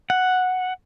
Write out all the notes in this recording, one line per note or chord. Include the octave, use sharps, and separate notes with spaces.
F#5